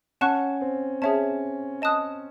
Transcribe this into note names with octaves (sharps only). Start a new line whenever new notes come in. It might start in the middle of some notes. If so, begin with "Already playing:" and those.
C#4 F#5 A5 C#6 F#6
C4
C#4 G#4 C#5 E5 A5
D#5 A5 D#6 F#6